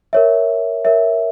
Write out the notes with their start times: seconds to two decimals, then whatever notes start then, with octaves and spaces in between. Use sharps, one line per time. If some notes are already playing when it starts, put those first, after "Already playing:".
0.13 A#4 C#5 E5
0.85 A#4 C#5 E5